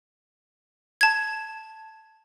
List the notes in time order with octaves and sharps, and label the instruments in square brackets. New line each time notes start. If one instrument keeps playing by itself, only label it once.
[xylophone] A5 G#6